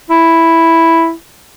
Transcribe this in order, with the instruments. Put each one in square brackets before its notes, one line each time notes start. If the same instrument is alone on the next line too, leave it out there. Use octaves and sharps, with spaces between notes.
[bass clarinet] E4